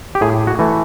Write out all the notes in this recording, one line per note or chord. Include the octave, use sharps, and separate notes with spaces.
G4
A2 G#4
F#4
E3 A3